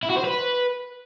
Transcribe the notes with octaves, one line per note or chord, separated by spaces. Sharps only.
E4
F#4
C5
B4